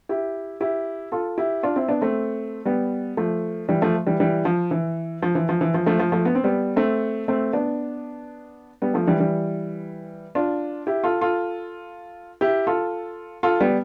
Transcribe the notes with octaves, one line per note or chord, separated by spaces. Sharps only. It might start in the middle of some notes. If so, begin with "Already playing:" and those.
E4 G4
E4 G4
F4 A4
E4 G4
D4 F4
C4 E4
B3 D4
A3 C4
G3 B3
F3 A3
E3 G3
F3 A3
E3 G3
E3 G3
F3
E3
F3
E3
F3
E3
F3
F3 A3
F3
F3 A3
B3
C4
G3 B3
A3 C4
A3 C4
B3 D4
G3 B3
F3 A3
E3 G3
E3 G3
D4 F4
E4 G4
F4 A4
F4 A4
E4 G4
F4 A4
F4 A4
G3 B3